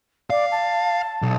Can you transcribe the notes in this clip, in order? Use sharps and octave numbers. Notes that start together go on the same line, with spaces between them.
D5 F5
A5
B1